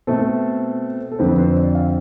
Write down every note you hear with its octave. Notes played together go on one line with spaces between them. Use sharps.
B2 A3 C4 A4
A4
F2 D3 F3 C4 B4
C5
D5
F5